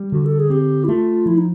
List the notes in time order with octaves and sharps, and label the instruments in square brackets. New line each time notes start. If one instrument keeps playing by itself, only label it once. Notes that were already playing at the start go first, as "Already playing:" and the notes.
Already playing: [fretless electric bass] G3
[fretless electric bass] D3 [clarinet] F#4
[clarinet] A4
G#4
[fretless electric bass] C4 [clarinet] G4
[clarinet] E4
[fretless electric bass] A3 [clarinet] F4
[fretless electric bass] F3 [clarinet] E4
[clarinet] D#4